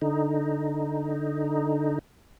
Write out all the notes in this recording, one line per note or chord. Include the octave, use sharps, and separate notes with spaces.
D3 D#4